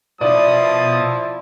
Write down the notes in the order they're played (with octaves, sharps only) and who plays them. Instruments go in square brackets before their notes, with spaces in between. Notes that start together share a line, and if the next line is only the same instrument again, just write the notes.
[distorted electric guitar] B2 B4 [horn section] F3 E4 A5 [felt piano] D5 [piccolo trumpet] D#6